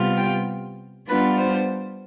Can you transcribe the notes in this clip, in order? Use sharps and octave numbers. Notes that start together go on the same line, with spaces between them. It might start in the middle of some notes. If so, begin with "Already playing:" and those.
Already playing: C3 G3 B3 F4
G5
G3 B3 D4 F4 B4
C5